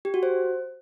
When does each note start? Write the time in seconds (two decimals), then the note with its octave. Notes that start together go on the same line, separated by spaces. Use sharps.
0.05 G4
0.14 F#4
0.23 C5